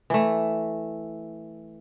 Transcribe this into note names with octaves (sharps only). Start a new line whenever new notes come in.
E3 A3